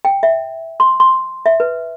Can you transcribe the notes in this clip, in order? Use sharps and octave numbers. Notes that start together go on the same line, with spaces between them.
G5
E5
C6
C6
E5
B4